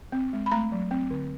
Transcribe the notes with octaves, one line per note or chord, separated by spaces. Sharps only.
C4
G#3
B5
A3 A#5
F#3
C4
D3